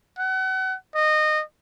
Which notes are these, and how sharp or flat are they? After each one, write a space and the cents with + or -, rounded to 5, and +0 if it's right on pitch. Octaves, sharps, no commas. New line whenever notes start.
F#5 +35
D#5 -20